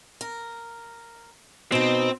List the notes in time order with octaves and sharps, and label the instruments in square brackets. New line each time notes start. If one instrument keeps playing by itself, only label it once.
[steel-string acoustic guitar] A#4
[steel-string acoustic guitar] B2 D#4 [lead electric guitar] C4